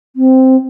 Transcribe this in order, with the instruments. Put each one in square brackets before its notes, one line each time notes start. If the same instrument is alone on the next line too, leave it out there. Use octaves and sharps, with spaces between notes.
[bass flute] C4